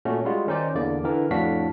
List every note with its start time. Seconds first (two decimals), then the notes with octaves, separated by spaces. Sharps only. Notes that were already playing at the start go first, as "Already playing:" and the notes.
0.05 A#2 A3 C#4 F#4
0.25 G3 G#3 F4 F#4
0.47 D#3 C#4 D#4 C5 D5
0.75 E2 D3 A#3 D5
1.04 D3 E3 A#4
1.31 F2 A2 D4 F#4 F5 B6